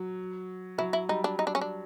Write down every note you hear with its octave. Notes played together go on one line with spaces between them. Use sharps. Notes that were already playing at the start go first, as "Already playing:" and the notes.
Already playing: F#3
F#3 E4
E4
G3 D#4
D4
D#4
D4
C#4
D4